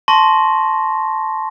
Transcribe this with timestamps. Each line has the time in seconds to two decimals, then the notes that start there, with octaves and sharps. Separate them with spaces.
0.08 A5 C6 C#6 A#6